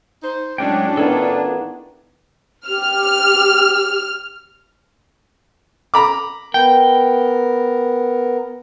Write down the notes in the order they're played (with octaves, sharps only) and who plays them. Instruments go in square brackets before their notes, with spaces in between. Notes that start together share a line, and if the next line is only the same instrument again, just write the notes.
[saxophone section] D#4 C5
[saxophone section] A2 C#4 [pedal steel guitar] F#3 G#3 G5 [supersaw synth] D4
[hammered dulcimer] D#3 E3 B3 [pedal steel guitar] F4 G#4 A4
[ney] G4 [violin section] F6
[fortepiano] A#5 B5 D6
[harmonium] B3 A#4 [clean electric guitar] G5